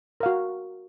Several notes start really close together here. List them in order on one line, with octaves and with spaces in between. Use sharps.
A#4 F5 F#4